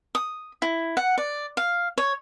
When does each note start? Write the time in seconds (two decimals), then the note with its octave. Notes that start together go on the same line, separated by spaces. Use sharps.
0.15 D#6
0.62 E4
0.97 F#5
1.18 D5
1.57 F5
1.98 C#5